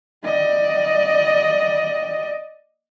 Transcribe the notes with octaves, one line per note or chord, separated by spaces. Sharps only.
D5 D#5